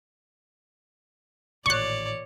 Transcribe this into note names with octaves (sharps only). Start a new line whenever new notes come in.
A1 A#2 D#3 C#5 D5 C#6 F#6